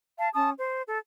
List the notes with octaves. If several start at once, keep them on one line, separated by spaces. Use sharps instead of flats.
F5 A5
C#4 A5 D#6
C5
A4